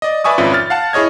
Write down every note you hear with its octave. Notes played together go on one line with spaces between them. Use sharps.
D5 D#5
B4 D5 E5 G#5 C#6 D#6
G#1 F2 C#4 F4 B4 E5
F6 A6
F5 F#5 A5
E4 G#4 C#5 D#5 G#6